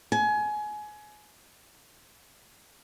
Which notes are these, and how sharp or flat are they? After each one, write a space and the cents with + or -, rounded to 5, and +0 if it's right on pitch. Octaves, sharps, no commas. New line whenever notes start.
G#5 +25